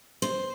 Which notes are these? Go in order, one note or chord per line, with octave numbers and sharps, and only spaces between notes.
C5